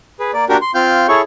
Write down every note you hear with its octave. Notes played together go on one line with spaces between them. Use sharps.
G#4 B4
A#3 D5
A#3 D4 F#4 G4 A#4
C6
C4 F4 F5 G6
E4 G#4 A4 C#5 C#6